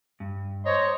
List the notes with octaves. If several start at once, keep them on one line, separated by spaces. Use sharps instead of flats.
G2
C5 C#5 D#5 A#5